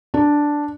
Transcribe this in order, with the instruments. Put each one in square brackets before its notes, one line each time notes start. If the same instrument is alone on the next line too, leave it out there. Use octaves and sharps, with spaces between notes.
[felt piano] D4